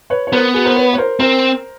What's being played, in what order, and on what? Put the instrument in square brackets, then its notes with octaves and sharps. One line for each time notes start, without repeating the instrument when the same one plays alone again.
[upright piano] B4 C#5
C#5
[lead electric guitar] B3 [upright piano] A#4 C5
[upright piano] F#4 G#4
A#4 C5
B4 C#5
C#5
A#4 C5
[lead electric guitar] C4 [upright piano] A#4 C5